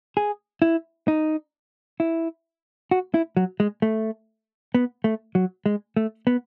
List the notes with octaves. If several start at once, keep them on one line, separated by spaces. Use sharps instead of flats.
G#4
E4
D#4
E4
F#4
E4
F#3
G#3
A3
B3
A3
F#3
G#3
A3
B3